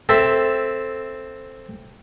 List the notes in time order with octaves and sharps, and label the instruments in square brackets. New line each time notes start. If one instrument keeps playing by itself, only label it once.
[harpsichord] C4 A4 E5